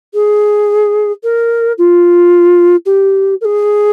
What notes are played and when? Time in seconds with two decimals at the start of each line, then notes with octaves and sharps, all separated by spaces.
0.14 G#4
1.23 A#4
1.78 F4
2.86 G4
3.41 A#4
3.45 G#4